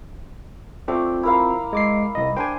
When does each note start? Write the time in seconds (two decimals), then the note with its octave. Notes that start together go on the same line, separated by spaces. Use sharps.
0.88 A3 C4 F4 D5
1.23 E4 A#4 F5
1.73 G#3 D6 C7
2.15 C2 D#5
2.37 D4 C5 G5 G#5